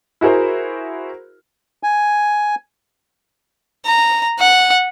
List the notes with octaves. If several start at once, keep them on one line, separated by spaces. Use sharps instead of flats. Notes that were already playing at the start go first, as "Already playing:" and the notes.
E4 F#4 G#4 A#4 C5
G#5
A#5
F#5